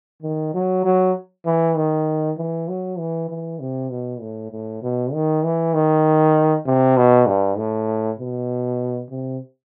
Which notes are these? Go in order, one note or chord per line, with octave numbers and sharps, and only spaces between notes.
D#3
F#3
F#3
E3
D#3
E3
F#3
E3
E3
C3
B2
A2
A2
B2
D#3
E3
D#3
C3
B2
G2
A2
B2
C3